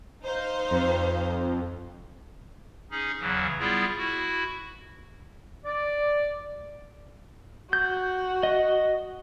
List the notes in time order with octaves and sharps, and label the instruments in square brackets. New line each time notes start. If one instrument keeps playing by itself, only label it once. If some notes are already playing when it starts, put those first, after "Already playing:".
[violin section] D#4 C5 F5
[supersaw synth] F2
[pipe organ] C#4 D#4 G#4
E2 C#3 E3 F#3
G3 B3 E4 F4 G#4
E4 F#4
[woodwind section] D5
[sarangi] F#4 [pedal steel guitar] G6
[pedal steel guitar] D#5